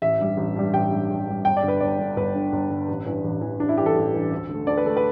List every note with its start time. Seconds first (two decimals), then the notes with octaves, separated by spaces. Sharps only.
0.02 A1 E5
0.19 G2 G3
0.37 A1
0.56 G2 G3
0.74 A1 G5
0.91 G2 G3
1.10 A1
1.27 G2 G3
1.45 G1 G5
1.57 D5
1.63 G2 D3
1.68 B4
1.80 G1 D5
1.99 G2 D3
2.16 G1 B4
2.35 G2 D3
2.52 G1
2.70 G2 D3
2.88 A1
3.06 G2 E3
3.24 A1
3.41 G2 E3
3.59 A1 D4
3.69 E4
3.77 G2 G4
3.81 E3
3.86 A4
3.95 A1
4.14 G2 E3
4.32 D2
4.49 D3 A3
4.67 D2 D5
4.77 B4
4.85 D3 A3 A4
4.97 B4